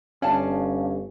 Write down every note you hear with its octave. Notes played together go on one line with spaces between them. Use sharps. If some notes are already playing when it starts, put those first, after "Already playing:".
G1 C#4 D5 F5 A5